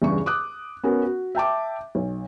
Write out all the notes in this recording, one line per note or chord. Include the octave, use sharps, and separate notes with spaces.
E2 G2 C#3 C#6
D6 D#6 F#6
B3 C#4 F#4 A#4
F#4
E5 G5 A5 D6
B1